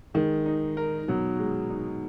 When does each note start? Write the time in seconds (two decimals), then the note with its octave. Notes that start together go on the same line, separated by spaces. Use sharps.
0.14 D#3 G#3
0.46 D#4
0.77 A#4
1.08 B2 F#3
1.39 G#3
1.70 D#4